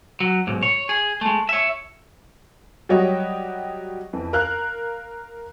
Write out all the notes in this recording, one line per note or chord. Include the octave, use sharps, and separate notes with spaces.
F#3
B1 G#2
C#5
G#4
G#3 A3
C#5 E5
F#3 G3 F#4 G4 C#5 D#5
F2 E3
A#4 F5 F6 F#6